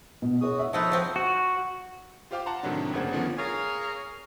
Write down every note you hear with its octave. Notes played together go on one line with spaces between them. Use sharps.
B2
F#4 G#4 C#5 D#6
E5
F3 D#4 A4 B4 C#5 A5
F3 C4
F#4
F4 G4 C5 F5 G5 D6
F#5 A5 A#5 C6
A2 C3 D#3 F#3 D4
G1 C#3 A#3 C5 F#5 G#6
D3 D#3 F3 A#3 B3 C#4
G#4 A#4 C#5 F5